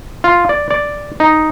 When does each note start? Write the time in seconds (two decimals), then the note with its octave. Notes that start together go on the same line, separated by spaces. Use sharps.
0.24 F4
0.49 D5
0.70 D5
1.20 D#4